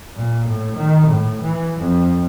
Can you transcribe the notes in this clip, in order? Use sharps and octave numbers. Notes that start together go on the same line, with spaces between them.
A#2
A2
D#3
A2
E3
F2